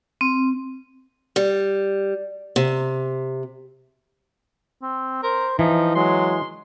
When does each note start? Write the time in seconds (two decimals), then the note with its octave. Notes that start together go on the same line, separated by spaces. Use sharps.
0.21 C4
1.36 G3
2.56 C3
4.82 C4
5.23 A#4 C5
5.59 E3 F3 D#4
5.95 F#3 G#3 C6